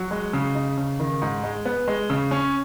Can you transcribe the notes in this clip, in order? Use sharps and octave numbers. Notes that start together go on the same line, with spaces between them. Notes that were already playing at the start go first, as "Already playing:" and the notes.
Already playing: F#3
G#3
C#3
D#4
C#3
D#3
G#2
G#3
B3
G#3
C#3
C#4